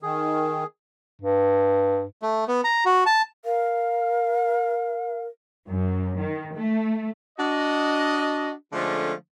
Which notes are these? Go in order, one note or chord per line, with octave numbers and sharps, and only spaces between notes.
D#3 G#4
G2
A3
B3
A#5
F#4
A5
A#4 F5
F#2
D#3
A3
D4 F#4 D#5
D3 F3 G#3 A3 C#4 D4